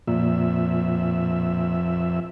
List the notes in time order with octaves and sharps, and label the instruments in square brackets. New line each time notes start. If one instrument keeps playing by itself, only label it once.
[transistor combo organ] F2 E5 [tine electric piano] A#2